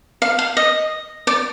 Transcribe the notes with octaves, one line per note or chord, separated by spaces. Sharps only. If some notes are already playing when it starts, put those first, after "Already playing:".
F5
F5
D#5
D5